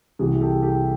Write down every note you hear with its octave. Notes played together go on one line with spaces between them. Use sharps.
C2 C3 E3 F#4 G#4
G4 A4
G4 A4